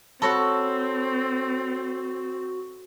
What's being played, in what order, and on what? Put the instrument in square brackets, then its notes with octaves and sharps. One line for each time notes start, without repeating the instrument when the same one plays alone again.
[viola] C4 [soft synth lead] F#4 [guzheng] A4 C#5 F#5 [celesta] A5 B5 A#6